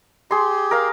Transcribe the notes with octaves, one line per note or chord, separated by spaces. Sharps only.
G4 G#4 C6
A#4 F5